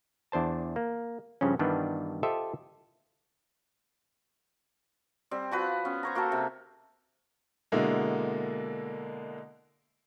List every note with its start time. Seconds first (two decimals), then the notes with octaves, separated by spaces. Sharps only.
0.32 E2 D4 C5 A5
0.76 A#3
1.41 G2 C#3 F3 C#4
1.59 G2 D#3 E3 G3 B3 D4
2.23 F4 G4 A4 C5 D#5 E5
5.31 G3 C4
5.51 F3 F#4 B4
5.85 B3 C#4
6.03 C5 C#5 A#5
6.15 A#3 F#4 G4 A4
6.32 C3
7.72 B2 D3 G#3 A#3 E4